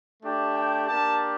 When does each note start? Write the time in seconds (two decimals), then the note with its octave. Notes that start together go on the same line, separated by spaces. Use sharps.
0.22 A3 D4 G4
0.54 G5
0.86 A#3 D4 G4 A5